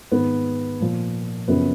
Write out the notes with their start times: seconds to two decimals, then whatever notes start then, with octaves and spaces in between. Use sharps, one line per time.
0.11 G#2 D#3 B3
0.80 A#2 F3
1.48 F#2 C#3 F3 B3